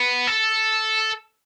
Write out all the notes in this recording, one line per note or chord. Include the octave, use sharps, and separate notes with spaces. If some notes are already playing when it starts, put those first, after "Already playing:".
Already playing: B3
A4